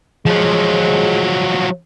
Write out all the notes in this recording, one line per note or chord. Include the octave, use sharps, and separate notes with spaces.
F3 F#3 G#3